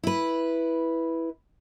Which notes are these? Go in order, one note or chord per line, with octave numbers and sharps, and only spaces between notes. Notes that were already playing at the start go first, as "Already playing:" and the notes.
E4 B4